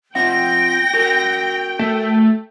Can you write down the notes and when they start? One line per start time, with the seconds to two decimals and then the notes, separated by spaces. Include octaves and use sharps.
0.15 C4 F4 F#5 G5 A#6
0.93 F#4 A#4
1.79 A3